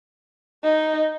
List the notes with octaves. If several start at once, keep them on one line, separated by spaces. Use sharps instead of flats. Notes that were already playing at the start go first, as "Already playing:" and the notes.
D#4